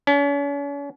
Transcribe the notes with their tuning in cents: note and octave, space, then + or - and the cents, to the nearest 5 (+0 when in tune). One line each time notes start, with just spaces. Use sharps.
C#4 +40